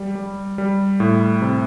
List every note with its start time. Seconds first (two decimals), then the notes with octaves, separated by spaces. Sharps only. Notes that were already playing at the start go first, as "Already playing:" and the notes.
Already playing: G3
0.15 G3
0.58 G3
1.00 A2
1.42 C3